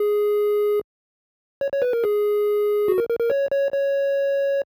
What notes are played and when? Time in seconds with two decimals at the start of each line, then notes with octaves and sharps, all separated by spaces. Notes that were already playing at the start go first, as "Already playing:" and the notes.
Already playing: G#4
1.61 C#5
1.72 C#5
1.82 B4
1.93 A#4
2.04 G#4
2.88 F#4
2.98 A#4
3.09 A#4
3.19 A#4
3.30 C#5
3.51 C#5
3.72 C#5